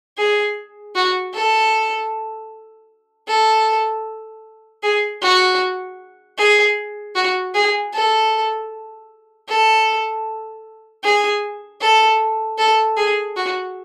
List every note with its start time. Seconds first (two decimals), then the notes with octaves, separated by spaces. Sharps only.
0.18 G#4
0.95 F#4
1.34 A4
3.28 A4
4.83 G#4
5.22 F#4
6.38 G#4
7.15 F#4
7.54 G#4
7.93 A4
9.48 A4
11.04 G#4
11.81 A4
12.58 A4
12.97 G#4
13.36 F#4